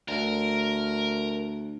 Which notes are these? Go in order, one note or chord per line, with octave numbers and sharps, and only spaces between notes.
D2 A#4